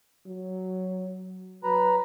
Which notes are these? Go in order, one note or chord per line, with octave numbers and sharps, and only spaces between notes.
F#3
F#3 B4 A#5 B5